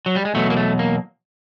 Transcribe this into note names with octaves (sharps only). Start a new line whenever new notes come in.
F#3
G3
G#3
E2 B2 F#3 A3
A#3
A3
A#3